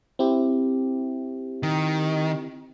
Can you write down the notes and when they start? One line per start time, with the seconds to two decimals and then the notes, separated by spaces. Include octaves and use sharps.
0.19 C4 E4 G4
1.63 D#3